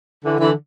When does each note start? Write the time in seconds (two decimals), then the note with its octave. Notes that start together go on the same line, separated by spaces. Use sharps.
0.24 D3 E3
0.39 D3 E3